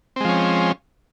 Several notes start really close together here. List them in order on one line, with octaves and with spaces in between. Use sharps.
C4 G#3 F3 C#4